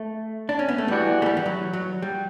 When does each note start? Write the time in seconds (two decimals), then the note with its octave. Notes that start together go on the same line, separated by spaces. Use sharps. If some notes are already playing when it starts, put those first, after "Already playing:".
Already playing: A3
0.49 D4
0.59 C#4
0.69 B3
0.78 A3
0.88 E3 G3 B3 D4 F#4
1.22 A3
1.26 G3
1.37 E3
1.46 F#3
1.73 F#3
2.02 G3